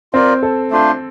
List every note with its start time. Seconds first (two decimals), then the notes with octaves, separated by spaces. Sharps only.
0.13 C4 F4 A#4 D5
0.43 A4
0.71 A3 D4 F4 C5